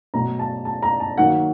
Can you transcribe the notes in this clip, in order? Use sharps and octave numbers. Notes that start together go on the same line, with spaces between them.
B2 F#3 A3 A#5
A5
A5
A#5
A5
D#3 F#3 A#3 F#5